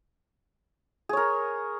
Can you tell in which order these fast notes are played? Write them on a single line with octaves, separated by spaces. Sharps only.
G#4 C#5 A#4